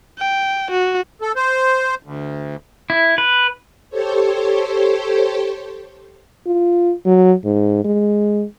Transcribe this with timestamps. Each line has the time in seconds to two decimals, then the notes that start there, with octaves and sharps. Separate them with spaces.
0.18 G5
0.71 F#4
1.21 A4
1.36 C5
2.03 D2
2.90 E4
3.18 B4
3.90 G4 A4 C5 C#5
6.47 F4
7.06 F#3
7.45 G#2
7.85 G#3